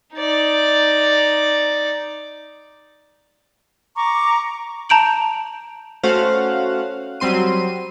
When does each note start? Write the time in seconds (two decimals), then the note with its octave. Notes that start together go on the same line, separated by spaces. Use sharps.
0.14 D#4 D5
3.95 A#5 C#6 D6
4.89 A5 A#5 G6 D7 F#7
6.03 A3 C#4 F#4 C5 F5 F#5
7.20 F#3 G3 C4 C6 D#7